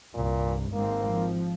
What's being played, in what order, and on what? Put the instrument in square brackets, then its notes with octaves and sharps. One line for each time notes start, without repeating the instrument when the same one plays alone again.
[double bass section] C2 G2 [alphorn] A#2
[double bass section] G#1 G#3 C4 [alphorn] A#3
[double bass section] F3